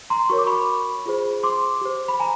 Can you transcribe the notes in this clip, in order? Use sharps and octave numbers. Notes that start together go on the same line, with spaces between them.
A#5 C6
F#4 A#4 C#5 C#6
D6
B5 C#6
F4 G#4 C5
C6 D6
G4 C5
B5
G#5 A#5